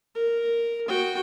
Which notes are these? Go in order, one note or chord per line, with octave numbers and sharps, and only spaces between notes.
A#4
F#4 G5